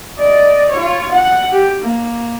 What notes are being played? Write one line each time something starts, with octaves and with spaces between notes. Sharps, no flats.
D5 D#5
F4 C#5
F#5
G4
A#3